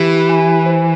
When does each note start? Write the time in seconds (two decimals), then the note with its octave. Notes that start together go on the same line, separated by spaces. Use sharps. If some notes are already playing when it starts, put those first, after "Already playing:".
Already playing: E3 G4
0.29 G#5
0.66 C5